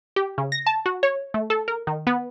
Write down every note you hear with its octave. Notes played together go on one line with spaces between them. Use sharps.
G4
C#3
A#6
A5
F#4
C#5
A3
A4
A#4
D#3
B3